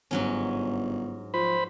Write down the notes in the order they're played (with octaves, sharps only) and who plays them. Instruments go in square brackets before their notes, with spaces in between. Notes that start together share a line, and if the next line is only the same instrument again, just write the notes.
[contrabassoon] G1 [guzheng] G#2 F#3 C#4
[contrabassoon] F3 [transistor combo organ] C5 B5